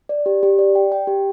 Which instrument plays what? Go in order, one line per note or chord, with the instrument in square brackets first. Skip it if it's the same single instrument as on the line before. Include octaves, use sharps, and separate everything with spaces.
[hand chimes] D5
G4
G4
D5
G5
G5
G4